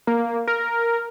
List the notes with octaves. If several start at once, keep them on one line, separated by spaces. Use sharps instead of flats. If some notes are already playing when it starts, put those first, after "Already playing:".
A#3
A#4